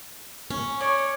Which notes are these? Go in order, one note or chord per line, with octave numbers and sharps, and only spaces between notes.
C#4
C#5 D5